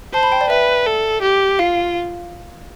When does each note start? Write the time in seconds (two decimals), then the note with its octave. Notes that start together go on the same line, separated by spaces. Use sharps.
0.13 C5 A5
0.23 B5
0.32 G5
0.41 D5
0.50 B4 E5
0.87 A4
1.22 G4
1.59 F4 F5